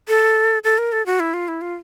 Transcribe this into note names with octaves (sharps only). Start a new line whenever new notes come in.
A4
A4
A#4
A4
F#4
E4
F4
E4
F4